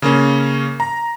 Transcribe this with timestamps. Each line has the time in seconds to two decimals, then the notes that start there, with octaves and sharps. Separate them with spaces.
0.02 C#3 A#3 C#4
0.80 A#5